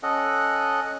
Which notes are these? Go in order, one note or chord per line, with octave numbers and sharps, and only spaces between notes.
C#4 A4 D#5 F#5